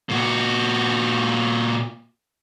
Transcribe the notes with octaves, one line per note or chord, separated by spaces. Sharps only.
A#2 F#4